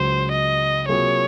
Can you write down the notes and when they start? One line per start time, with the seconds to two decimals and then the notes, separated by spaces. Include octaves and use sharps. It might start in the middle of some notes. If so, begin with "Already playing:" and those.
Already playing: C#2 C#3 F#3 C5
0.32 D#5
0.89 C3 F#3 A#3 F4 G#4 C#5